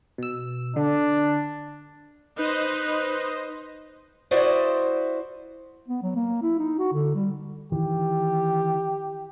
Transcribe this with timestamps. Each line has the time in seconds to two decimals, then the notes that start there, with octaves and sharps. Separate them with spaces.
0.18 B2 E6
0.76 D3 D4
2.37 D#4 B4 C5 D#5
4.31 E4 F#4 C5 D5 D#5
5.88 B3
6.03 F#3
6.16 A#3
6.43 E4
6.59 D#4
6.79 F#4
6.93 D3
7.15 G3
7.72 D#3 E3 G4